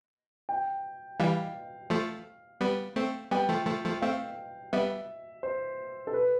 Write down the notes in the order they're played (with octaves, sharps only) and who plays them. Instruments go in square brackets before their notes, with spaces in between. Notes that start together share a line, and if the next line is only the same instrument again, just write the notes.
[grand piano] G5
[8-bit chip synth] E3 G3 [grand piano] F5
[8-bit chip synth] F3 A3
G3 B3
A3 C4
[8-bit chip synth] G3 B3 [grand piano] G5
[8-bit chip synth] F3 A3
F3 A3
F3 A3
[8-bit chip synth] A3 C4 [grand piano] F5
[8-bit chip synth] G3 B3 [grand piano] E5
[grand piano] C5
A4
B4